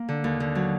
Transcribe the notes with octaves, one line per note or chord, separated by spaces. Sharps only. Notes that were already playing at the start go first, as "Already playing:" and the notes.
Already playing: A#3
D3
D#2
D3
F#3